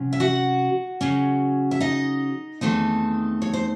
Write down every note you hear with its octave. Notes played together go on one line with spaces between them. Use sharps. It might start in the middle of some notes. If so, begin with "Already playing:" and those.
Already playing: C3 F#3 C#4
E5
F#4 F#5
C#3 F#3 C#4
E5
D#4 D#5
E2 D#3 A3 C4 D#4
C#5
C5